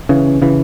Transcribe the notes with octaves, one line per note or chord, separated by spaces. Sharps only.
C#3 E3
C#3 E3